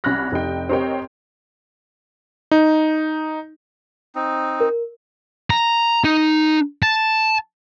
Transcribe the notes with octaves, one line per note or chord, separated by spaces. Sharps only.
C2 C#4 B5 F6 F#6 A#6
F1 D#4 G4 G5
C4 G4 A#4 C#5 D#5 G5
D#4
C4 D#4
A#4
A#5
D#4
A5